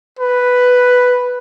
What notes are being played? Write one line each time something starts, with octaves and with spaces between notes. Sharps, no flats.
B4